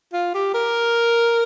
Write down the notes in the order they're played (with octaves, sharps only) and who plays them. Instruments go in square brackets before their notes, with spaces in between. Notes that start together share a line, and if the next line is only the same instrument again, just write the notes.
[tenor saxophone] F4
G4
A#4